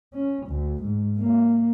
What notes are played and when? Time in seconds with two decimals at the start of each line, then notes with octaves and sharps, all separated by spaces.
0.13 C#4
0.47 D2
0.83 G#2
1.18 A#3